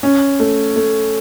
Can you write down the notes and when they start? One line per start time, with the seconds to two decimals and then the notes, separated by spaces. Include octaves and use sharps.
0.03 C#4
0.40 A3
0.76 A3